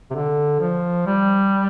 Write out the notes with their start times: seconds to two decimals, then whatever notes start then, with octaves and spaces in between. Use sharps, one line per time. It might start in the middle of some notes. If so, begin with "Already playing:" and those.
0.11 C3
0.15 D3
0.61 F3
1.06 G3